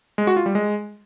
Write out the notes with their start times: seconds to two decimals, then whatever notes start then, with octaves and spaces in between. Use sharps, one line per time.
0.18 G#3
0.27 F#4
0.37 F4
0.46 G3
0.55 G#3